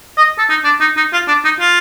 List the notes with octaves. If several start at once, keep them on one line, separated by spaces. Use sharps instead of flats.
D#5
A4
D#4
D4
D#4
D#4
F4
D4
D#4
F4